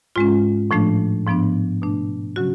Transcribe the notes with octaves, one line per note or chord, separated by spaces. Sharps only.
G#2 G#3 C#4 F4
A2 F3 A3 D4
G#2 F3 B3 D4
B2 A3 D4
C#3 F#3 C#4 F#4